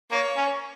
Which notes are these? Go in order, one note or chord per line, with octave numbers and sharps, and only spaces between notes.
A#3 C#5
C#4